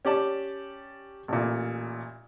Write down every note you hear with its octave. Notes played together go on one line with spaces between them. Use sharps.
C#4 G4 D5 A5
A1 A#2